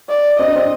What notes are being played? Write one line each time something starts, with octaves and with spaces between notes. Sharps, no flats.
D5
C4 D#5
D4
C4